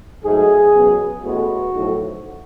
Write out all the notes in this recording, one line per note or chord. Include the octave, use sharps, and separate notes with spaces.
G#2 F#3 A3 G#4
C#2 B2 F#3 B3
A1 A2 G#3 B3 F#4
B1 A2 F3